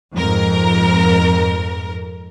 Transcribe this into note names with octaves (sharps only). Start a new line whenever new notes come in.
F2 G#2 A#4